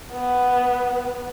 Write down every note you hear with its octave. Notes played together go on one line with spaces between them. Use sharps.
B3